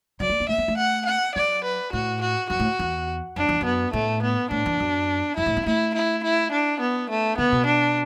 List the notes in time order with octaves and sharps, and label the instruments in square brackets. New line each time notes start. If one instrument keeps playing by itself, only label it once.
[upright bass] F#3 [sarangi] D5
[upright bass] A3
B3
[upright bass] A3 [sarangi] E5
[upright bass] B3
A3
[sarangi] F#5
F#5
[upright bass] F#3 [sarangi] D5
[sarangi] B4
[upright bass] A2 [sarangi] F#4
[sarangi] F#4
[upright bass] F#2 [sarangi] F#4
[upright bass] A2
E2
[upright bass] F#2 [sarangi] D4
[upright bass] E2
[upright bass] F#2 [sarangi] B3
[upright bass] A2 [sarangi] A3
[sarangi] B3
[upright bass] A2 [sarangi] D4
[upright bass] E2
F#2
[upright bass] F#2 [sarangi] E4
[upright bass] A2
B3
[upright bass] A3 [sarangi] E4
[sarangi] E4
E4
D4
B3
A3
[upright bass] D3 [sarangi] B3
[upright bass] B2
[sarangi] D4